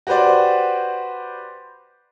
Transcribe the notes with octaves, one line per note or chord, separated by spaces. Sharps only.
F#4 G4 B4 C5 D5